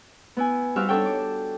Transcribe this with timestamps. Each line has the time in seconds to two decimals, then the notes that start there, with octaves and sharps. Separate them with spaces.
0.37 B3 E4 G#5
0.76 G3 C4 D#4 F#4 E5 F5
0.89 D4 D#4 F#4 A4 C#5 G5
1.06 D6